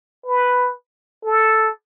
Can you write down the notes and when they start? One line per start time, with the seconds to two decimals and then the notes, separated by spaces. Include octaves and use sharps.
0.26 B4
1.25 A4